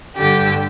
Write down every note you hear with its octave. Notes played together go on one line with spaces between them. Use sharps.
G2 D3 G4